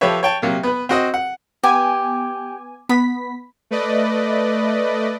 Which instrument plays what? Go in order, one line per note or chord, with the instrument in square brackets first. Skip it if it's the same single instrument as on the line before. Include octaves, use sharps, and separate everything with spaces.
[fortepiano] F3 G4 A4 B4 C#5 E5
C#5 G5 A5
C3 F#3 A#3
B3 B4
C4 F#4 D#5
F#5
[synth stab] B3 G#5 [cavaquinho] G4
[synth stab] B3 B6 [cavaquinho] B5
[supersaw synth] A3 B4 D5 D#5